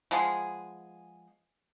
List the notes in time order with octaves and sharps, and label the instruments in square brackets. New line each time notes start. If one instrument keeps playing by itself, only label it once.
[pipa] F3 G#3 B3 G#4